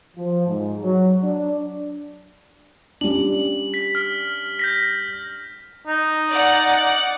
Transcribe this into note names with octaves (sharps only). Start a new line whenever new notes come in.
F3
G#2
F#3
D4
G3 C#4 D4 F#7
B6
F6
G6 A#6 B6
D#4
D5 F#5